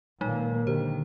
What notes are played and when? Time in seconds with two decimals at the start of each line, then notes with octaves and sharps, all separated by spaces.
0.21 A#2 D#3 F#3 G#3 A#3 D#4
0.67 D3 D#3 D4 G4 C5